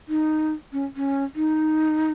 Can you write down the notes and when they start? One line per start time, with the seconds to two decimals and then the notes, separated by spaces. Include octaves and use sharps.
0.08 D#4
0.73 C#4
0.96 C#4
1.35 D#4